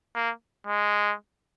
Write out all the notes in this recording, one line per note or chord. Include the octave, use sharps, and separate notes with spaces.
A#3
G#3